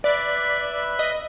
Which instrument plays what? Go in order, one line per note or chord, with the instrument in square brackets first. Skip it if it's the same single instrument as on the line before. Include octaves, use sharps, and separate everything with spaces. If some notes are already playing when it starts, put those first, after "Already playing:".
[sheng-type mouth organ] B4 E5 B5 [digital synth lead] D5
[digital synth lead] D#5